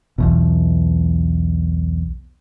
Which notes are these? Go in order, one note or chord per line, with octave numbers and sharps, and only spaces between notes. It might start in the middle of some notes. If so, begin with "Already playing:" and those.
B1 E2 B2